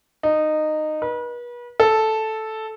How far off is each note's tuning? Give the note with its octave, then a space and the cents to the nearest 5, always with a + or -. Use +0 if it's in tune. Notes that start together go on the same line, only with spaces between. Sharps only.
D#4 -15
B4 -35
A4 -5